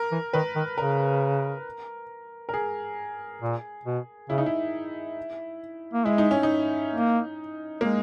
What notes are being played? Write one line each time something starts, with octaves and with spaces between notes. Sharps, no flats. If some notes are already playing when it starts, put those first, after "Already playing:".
Already playing: A#4
E3
D#3 B4
D#3
C#3 A#4
A#4
G#4
A#2
B2
C#3 E4
D#4
E4
A#3
G#3 E4
D#4
C#4
D#4
A#3
G#3 A#3